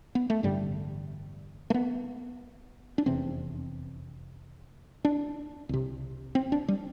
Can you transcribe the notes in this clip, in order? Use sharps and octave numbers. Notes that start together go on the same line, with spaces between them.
B3
A3
A1 G2 D3 G3
A3
B3
D4
F1 E2 C3 C4
D4
C2 C3
C4
D4
G3